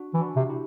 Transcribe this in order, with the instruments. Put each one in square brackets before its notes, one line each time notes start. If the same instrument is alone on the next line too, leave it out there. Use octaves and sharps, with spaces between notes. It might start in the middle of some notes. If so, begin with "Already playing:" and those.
Already playing: [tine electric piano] D4 F#4
[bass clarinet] E3
[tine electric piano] D4 F#4
[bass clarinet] C3
[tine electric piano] E4 G4